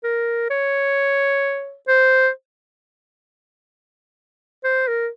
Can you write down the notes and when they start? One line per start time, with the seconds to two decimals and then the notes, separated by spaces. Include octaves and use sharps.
0.04 A#4
0.50 C#5
1.88 C5
4.64 C5
4.88 A#4